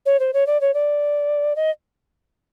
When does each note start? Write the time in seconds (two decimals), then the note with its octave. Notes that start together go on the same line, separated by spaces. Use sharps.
0.06 C#5
0.19 C5
0.33 C#5
0.46 D5
0.61 C#5
0.74 D5
1.56 D#5